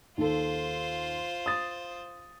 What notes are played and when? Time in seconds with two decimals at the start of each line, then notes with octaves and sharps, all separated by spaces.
0.17 D#2 F4 A4 C5
1.46 D#6 A6